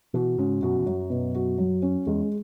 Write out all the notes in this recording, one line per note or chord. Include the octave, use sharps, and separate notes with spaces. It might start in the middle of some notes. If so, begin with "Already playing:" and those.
B2 E3 F#4
G#2 C#3 C#4
F#2 B2 F#4
E2
F#2 F#3
B2
F#4
F#3
C#4
E2 G#3